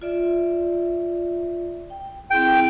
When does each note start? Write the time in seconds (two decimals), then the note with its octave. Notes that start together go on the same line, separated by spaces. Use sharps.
0.01 F4 D5 E5
1.90 G5
2.31 C4 E4 G#4 G5